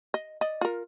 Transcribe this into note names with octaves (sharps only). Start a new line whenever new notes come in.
D#5
D5 D#5
F4 A#4